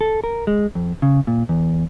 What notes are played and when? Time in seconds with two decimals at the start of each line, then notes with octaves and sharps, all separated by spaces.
0.01 A4
0.24 A#4
0.47 G#3
0.75 F2
1.02 C#3
1.27 A#2
1.49 E2